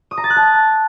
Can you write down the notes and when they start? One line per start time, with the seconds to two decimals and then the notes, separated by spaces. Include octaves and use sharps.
0.11 D#6
0.17 A#5
0.24 A6
0.30 F#6
0.36 A5